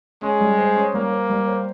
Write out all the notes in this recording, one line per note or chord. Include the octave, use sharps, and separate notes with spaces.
G#3 C#4
G3
C5
C#4
G3 A#3
C5
G3
C5